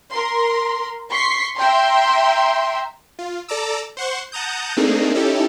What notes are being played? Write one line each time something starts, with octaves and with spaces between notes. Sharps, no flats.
A#4 C6
C6 C#6 B6 C7
E5 G5 A#5 C6
F4
A4 D5 A5 A#5 D6 E6
C5 F#5 C6 C#6
F#5 A5 A#5 D#6 G6
A3 A#3 C4 D4 D#4 G#4
C#4 D#4 E4 G4 A4